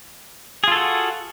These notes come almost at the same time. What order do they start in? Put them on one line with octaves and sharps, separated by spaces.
G#4 F4 A4 F#4